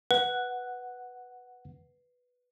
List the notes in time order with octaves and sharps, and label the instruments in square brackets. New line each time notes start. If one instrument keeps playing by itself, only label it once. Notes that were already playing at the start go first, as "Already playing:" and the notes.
[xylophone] B4 [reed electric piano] F#5